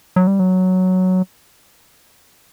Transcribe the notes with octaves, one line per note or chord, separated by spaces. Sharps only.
F#3
G3
F#3